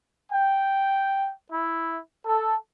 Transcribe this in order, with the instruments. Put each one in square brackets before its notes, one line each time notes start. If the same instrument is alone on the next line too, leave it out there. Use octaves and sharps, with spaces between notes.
[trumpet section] G5
E4
A4